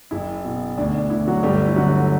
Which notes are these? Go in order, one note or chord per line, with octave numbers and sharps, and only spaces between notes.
F#1 E4
B2
D2 D4
D4
D2 E4
F#3 F#4
G1 G3 G4
E4
D3 F#3 F#4